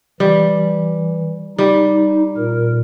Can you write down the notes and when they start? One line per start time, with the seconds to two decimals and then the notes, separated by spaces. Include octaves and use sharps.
0.20 E3 G3
1.58 G3 D#4
2.37 A#2 A#4